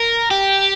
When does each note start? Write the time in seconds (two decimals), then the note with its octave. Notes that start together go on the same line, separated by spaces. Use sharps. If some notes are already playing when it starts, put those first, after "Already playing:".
Already playing: A#4
0.31 G4